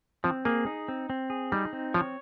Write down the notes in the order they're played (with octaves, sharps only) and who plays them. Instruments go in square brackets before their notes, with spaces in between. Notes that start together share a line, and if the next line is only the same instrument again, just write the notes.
[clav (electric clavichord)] F3 [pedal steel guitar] C4
[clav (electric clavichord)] A#3 [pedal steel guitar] G#4
[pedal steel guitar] D#4
C4
C4
G#4
[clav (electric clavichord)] G3 [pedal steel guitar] D#4
[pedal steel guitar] C4
[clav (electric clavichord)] F3 [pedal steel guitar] C#5